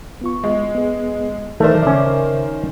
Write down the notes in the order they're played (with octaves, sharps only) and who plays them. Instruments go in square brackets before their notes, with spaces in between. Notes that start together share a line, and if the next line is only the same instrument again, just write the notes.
[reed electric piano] B3 F4 C#6
[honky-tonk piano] G#3
[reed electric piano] B3 G#4
[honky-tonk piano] D#3 A#4 C5 [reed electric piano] E3 D5 [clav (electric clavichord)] A3
[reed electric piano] C#3 E5 [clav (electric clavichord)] C#4 D5